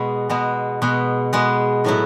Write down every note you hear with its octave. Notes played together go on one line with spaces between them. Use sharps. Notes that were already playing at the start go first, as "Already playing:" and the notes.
Already playing: B2 G#3 B3
B2 G#3 B3
B2 G#3 B3
B2 G#3 B3
A2 F#3 B3 E4